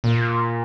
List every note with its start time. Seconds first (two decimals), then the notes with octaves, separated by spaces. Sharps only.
0.04 A#2